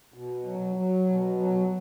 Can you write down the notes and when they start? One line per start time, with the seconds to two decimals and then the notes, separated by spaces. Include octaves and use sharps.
0.14 B2
0.45 F#3
0.76 F#3
1.06 B2
1.38 F#3